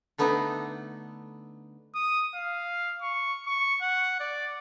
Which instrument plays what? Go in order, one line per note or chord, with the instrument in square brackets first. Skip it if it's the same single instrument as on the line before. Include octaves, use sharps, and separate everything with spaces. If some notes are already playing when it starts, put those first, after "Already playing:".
[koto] D3 A3 B3 D4 D#4
[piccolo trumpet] D#6
F5
C#6
C#6
F#5
D5